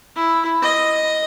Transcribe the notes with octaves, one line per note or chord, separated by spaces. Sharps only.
E4
D#5